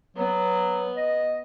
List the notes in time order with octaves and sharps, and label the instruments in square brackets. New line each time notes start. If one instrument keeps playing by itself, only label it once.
[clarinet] F#3 [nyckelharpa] B3
[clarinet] D#5